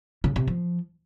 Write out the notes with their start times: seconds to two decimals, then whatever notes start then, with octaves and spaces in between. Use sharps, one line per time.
0.24 C#3
0.36 C3
0.48 F3